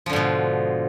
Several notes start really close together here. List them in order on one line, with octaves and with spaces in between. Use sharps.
F3 D3 G#2 B2